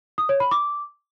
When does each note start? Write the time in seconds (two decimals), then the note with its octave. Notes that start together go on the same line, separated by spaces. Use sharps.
0.18 D#6
0.29 C#5
0.40 B5
0.51 D6